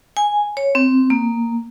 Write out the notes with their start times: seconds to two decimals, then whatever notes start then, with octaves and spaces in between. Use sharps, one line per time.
0.17 G#5
0.57 C#5
0.75 C4
1.10 A#3